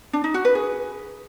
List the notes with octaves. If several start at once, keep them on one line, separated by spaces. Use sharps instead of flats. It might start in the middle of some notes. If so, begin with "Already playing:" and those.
D4
D#4
F#4
B4
G#4